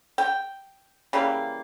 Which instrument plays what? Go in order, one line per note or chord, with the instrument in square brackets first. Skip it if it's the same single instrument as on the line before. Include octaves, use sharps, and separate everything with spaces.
[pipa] G5
C#3 E3 G3 A#3